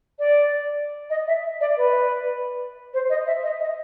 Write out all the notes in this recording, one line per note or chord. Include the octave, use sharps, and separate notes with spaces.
D5
D#5
E5
D5
B4
C5
D#5
E5
D#5
D#5